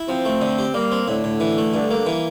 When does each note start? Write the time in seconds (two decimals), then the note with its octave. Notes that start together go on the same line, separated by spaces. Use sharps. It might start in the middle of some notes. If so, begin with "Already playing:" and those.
Already playing: E4
0.08 F3 C4
0.25 A3
0.42 D3
0.59 G4
0.74 G3 A#3
0.92 C4
1.08 A2 D3
1.24 A2
1.40 E3
1.58 A3
1.73 G2 D3
1.91 A#3
2.07 E3